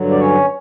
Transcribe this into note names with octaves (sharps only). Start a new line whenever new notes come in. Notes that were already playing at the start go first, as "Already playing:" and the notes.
Already playing: G2 D3 F#3
D5
C#4 C#5